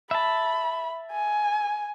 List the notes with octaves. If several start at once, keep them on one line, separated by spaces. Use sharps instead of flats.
E5 A5 B5
G#5